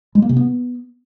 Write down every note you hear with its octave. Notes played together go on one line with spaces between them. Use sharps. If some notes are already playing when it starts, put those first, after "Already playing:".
G#3
A#3
C3
B3